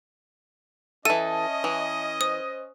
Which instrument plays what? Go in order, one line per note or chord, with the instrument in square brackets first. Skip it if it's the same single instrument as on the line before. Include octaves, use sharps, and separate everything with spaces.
[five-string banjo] E3 A4 [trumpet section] C#4 D#5 [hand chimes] E5 A5 [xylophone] D#7
[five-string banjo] E3
[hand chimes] C5 [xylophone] D#6